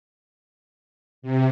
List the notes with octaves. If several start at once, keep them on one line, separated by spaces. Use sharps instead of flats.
C3